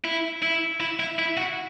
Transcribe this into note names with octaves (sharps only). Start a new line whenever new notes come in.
E4
E4
E4
E4
E4
F#4